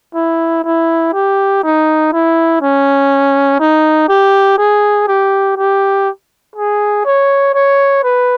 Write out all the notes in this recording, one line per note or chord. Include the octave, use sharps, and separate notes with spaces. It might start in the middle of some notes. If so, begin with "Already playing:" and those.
E4
E4
G4
D#4
E4
C#4
D#4
G4
G#4
G4
G4
G#4
C#5
C#5
B4